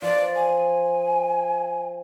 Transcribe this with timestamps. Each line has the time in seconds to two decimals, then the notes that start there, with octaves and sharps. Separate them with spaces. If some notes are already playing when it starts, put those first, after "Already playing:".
0.02 F3 D5
0.35 G#5